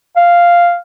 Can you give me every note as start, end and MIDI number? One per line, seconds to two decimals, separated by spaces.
0.16 0.78 77